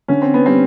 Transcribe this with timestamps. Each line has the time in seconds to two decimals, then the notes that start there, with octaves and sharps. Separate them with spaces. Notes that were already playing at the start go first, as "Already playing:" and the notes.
0.08 D3 C#4
0.22 C4
0.34 B3
0.46 G3 C4